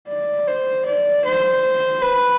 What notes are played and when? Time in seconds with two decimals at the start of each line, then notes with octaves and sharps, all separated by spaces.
0.08 D5
0.47 C5
0.86 D5
1.25 C5
2.02 B4